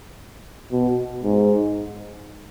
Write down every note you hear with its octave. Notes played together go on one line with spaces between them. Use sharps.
B2
G#2